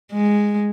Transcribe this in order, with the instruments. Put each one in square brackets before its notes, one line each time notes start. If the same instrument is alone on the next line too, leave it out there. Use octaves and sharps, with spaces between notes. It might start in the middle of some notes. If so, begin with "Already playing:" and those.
[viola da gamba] G#3